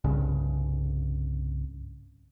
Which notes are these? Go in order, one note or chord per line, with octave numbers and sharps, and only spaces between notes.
C2 G2 C#3